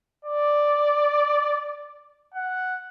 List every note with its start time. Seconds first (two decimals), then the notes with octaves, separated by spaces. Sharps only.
0.25 D5
2.34 F#5